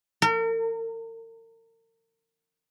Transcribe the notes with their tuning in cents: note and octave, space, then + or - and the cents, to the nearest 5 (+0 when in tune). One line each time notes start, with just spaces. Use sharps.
A#4 -40